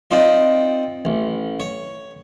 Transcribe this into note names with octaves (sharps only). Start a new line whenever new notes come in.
C4 D#4 F4 D5
A1
C#5